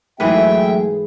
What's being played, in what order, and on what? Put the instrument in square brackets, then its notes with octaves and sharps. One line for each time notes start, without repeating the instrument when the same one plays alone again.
[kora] G#2 E3 B4 [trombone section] F#3 A3 [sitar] G#4 [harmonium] E5 G5